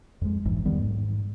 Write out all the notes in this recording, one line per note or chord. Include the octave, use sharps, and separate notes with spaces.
F2 G#3
F1 A#1 G#2 E3
E2 D#3 G3 B3
G#2